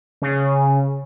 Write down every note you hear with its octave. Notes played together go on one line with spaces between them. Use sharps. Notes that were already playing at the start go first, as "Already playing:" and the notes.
C#3